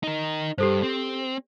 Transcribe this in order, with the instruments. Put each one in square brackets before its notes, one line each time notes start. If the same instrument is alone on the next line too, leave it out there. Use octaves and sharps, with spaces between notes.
[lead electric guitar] D#4 A#4
[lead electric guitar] G2 [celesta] G4 A4 C5
[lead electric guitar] C4